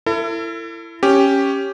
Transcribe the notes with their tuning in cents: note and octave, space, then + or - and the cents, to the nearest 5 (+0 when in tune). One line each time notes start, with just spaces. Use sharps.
E4 +25 A4 +40
C#4 +0 G4 +0